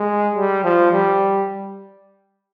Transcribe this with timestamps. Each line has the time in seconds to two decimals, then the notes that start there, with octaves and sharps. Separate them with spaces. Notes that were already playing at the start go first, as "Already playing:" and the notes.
Already playing: G#3
0.35 G3
0.64 F3
0.92 G3